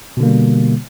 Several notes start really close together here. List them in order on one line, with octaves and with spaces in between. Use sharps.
B2 D3 A#3 G3